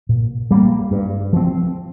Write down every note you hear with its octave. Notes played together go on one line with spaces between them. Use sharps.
A#2
G3 A#3
G2
F3 C4